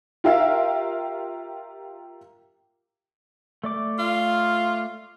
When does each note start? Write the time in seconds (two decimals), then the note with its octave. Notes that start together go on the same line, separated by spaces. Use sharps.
0.24 F4 G4 A#4 E5 F5
3.64 A3 D5 D6
3.99 F4